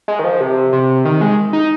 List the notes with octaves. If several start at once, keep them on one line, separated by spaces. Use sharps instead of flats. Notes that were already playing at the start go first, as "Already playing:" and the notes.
G#3
D#3
F3
C3
C3
D#3
G#3
D#4